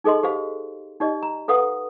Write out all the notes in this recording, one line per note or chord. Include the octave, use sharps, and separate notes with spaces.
D#4 G#4 A4 D#5 C6
G4 C5 F5
D#4 G4 D5 D#5
A#5
A4 B4 F5 F#5 D#6